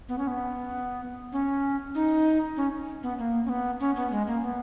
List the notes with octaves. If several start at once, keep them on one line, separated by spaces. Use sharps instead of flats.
B3
C#4
B3
C#4
D#4
C#4
B3
A#3
C#4
B3
C#4
B3
G#3
A#3
B3